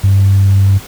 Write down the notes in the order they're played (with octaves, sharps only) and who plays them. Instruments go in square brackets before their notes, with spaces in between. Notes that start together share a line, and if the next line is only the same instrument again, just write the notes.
[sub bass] G2